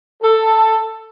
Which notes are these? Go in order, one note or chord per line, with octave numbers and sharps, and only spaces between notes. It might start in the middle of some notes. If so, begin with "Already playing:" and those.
A4